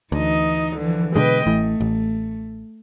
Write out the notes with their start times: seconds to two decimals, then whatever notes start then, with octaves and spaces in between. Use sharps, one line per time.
0.12 D2 E3 D#4 D#5
0.77 D3 E3 F3
1.16 B2 D3 G#3 B4 D#5 G5
1.47 A1 E3 A3
1.80 A1